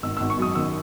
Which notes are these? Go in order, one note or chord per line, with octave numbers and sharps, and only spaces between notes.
G#1 E6
G#1 E6
C#6
F#2 D#6
D#3 E6